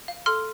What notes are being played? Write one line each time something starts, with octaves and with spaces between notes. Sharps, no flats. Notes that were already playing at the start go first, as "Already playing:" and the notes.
F5
A4 C6 F6